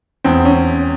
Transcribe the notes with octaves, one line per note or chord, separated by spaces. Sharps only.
E2 C4
C#4